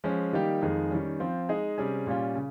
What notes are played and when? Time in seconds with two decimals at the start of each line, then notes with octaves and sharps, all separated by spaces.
0.04 F3 G#3 C#4
0.33 D#3 G3 A#3 D#4 G4
0.62 F2 D#3 G#3 D#4 G#4
0.91 D#3 G3 C#4
1.20 F3 C4 F4
1.49 G#3 D#4 G#4 D#5
1.78 C3 G3 C#4 G#4
2.07 A#2 G3 C#4 F4
2.36 C#3